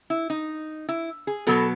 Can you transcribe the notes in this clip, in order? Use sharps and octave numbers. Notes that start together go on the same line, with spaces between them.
E4
D#4
E4
G#4
B2 F#3 B3 A4